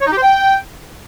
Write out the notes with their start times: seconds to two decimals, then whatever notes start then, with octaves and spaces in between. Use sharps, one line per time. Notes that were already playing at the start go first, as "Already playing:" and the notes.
0.01 C#5
0.06 D#4
0.11 G4
0.17 C5
0.22 G5